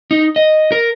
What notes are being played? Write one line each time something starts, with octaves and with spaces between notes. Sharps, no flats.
D#4
D#5
A#4